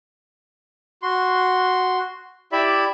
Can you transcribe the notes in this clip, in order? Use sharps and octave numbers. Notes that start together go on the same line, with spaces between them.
F#4 C6
E4 G4 D5 E5 B5